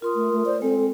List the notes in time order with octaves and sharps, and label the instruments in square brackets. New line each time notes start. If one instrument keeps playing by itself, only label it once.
[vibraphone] F4 C6 D#6 [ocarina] A#4
[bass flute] A3
A3
[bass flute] C5 [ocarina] D5
[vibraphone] G#3 [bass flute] C4 [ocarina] A4